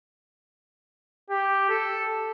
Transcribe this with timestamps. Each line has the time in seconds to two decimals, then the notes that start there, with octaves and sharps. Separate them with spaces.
1.30 G4
1.69 A4